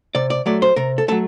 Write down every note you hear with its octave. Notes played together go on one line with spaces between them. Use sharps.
C3 D5
D5
F#3 A3 D5
C5
C3 A#4
A4
F#3 A3 A4